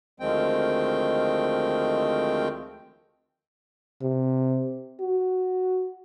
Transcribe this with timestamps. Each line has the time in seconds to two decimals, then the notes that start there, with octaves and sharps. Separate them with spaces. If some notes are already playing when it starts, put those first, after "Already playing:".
0.20 D2 D#3 F3 G#3 C4 G5
4.02 C3
5.00 F#4